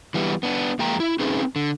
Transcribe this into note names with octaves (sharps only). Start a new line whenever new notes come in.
E3 G3 B3
B3 D4
F2 G#3 A#3 G5 A#5
E4
C4 C#4 D#4 G#4 B4
D3